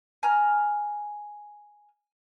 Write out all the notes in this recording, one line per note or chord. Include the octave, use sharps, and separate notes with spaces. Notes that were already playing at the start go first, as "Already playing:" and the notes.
G#5 A#5 F6